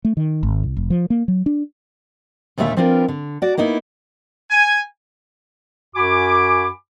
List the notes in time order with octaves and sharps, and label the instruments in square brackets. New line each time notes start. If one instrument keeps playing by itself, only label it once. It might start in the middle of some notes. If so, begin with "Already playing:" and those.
[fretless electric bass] A3
D#3
G#1
C2
F1
F3
A#3
F#3
D4
[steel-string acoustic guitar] D#2 A#2 D3 A3 E5 F5
F3 C4 D4 F4 A#4 B4
D3
F#4 D5
A#3 B3 D#4 E4
[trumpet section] G#5
[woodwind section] F#2 F#4 G#5 B5 D6